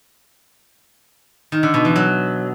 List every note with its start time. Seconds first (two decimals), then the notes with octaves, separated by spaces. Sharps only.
1.52 D#3
1.63 D3
1.74 B2
1.85 E3
1.96 F#3